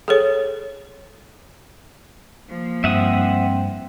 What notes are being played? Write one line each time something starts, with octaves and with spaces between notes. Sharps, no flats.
G#4 A4 C#5
F3 A#3
G2 C4 E5 F#5 D#6